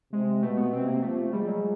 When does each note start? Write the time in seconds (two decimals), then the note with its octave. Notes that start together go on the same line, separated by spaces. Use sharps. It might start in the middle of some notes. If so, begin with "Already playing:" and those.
0.13 C3 G#3
0.43 B2 A3
0.57 B3
0.73 C3 C4
0.87 A#3
1.02 F3 A3
1.32 G3 G#3
1.47 F#3